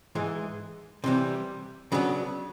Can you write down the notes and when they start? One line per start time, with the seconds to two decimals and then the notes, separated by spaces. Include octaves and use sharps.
0.15 G#2 E3 G#3
1.04 C3 E3 G3
1.92 C#3 F#3 B3 D4